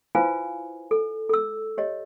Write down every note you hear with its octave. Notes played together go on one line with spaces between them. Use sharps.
E4 F4 B4 C5 F5 G#5
A4
A4 E6
G4 C#5 D#5